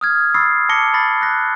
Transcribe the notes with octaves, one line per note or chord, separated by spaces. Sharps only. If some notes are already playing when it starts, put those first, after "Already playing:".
D#6 F6 G#6
B5 C#6 D#6 E6 A6 C7
A5 D6 A#6 C#7 G7
B5 D#6 A6 A#6 C7
F#6 A#6